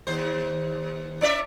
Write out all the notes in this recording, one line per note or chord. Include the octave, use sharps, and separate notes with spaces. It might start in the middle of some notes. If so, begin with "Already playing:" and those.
D#2 C5
C#4 D5 E5